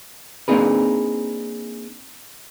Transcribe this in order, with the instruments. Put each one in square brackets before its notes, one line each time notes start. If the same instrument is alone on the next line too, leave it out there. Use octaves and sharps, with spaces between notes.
[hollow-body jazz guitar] A#3 C4 D4 D#4 G#4 B4